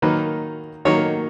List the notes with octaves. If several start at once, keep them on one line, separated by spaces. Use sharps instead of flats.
D#3 F#3 A#3 D#4 B4
D#3 F#3 A#3 D#4 C#5